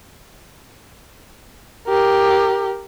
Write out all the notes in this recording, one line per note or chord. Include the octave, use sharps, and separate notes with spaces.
G4 A#4